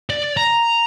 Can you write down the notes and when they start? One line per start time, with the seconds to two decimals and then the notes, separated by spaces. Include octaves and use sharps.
0.10 D5
0.37 A#5